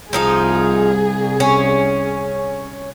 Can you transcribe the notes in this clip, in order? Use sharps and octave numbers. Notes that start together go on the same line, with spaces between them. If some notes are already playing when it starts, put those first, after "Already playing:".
C2 F3 D#4 F4 G#4
C#4